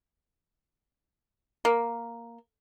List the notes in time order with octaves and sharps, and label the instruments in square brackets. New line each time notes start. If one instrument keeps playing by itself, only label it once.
[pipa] A#3